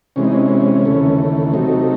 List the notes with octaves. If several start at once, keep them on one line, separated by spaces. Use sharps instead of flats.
C3 E3 G#3 C#4
D#4
C#4
D#2 C#3 E3 A3
C3 F#3 A3 D#4